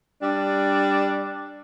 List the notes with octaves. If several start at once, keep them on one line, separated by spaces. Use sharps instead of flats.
G3 D4